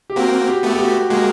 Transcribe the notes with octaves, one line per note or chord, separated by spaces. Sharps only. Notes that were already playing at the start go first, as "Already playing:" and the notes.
G4
A#3 C4 F#4
G4
A3 B3
G4
F#4
G#3 A#3 F#4